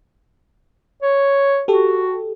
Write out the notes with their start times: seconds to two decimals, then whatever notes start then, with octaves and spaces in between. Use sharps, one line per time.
1.02 C#5
1.68 F#4 G4 A4